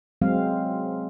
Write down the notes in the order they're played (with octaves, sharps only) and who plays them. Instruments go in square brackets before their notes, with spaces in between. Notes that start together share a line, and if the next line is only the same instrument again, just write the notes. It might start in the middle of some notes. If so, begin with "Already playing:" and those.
[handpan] F#3 G#3 C4 F5